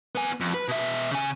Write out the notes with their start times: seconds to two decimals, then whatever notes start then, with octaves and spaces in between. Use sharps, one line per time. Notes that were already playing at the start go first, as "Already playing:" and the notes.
0.15 B3 G#5
0.40 F2
0.54 B4
0.68 B2 E5
1.11 C#3 G#5